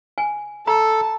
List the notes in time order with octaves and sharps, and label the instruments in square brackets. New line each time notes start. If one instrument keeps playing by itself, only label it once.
[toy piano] G#5
[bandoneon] A4 [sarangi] A5 [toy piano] A#5